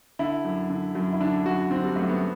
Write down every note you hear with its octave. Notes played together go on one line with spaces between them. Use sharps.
D3 E4
F#2
D3
F#2
E4
D3 D4
F#2 F#4
D3 C4
G3
F#2 A3
B3